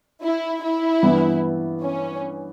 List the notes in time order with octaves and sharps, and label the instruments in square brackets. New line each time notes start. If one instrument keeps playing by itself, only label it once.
[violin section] E4
E4
[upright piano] G2 E3 B3
[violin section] C#4